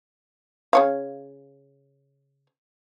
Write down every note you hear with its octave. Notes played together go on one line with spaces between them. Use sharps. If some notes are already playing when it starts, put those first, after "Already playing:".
C#3 C#5 F5